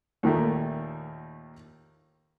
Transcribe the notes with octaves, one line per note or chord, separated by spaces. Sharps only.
D#2 A#2 D#3 A3